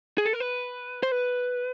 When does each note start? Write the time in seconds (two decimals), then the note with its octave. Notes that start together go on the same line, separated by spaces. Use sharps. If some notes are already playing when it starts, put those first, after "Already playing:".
0.18 G#4
0.25 A4
0.33 A#4
0.40 B4
1.03 C5
1.12 B4